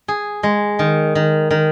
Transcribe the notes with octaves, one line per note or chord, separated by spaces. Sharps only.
G#4
G#3
D#3
D#3
D#3